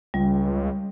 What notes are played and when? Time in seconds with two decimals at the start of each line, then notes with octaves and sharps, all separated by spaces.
0.14 C#2 G3